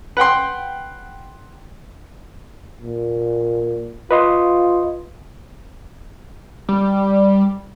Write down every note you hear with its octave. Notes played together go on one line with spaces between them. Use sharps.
B4 F#5 G5 C6
A#2
F4 B4 D#5 C6
G3